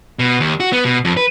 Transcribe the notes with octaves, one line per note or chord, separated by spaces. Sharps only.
B2
D#2
F#4
B3
B2
F2
B4